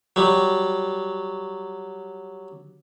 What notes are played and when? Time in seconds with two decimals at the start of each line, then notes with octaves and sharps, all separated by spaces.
0.16 F#3 G3